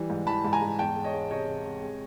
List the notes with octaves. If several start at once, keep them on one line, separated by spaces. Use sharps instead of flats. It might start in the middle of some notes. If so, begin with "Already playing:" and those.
Already playing: E3 G3
G#2
E3 A5 B5
G#2
G#5 A#5
G#2
E2 G5 A5
G#3
C#5 D#5
G#3
C3 C#5 D#5
C3
C3
G#3